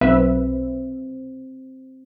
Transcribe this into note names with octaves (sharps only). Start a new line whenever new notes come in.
B1 C4 B4 E5